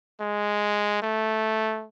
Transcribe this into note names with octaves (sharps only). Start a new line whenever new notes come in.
G#3
A3